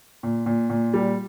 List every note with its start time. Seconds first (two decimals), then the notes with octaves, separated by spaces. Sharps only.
0.23 A#2
0.46 A#2
0.70 A#2
0.94 G3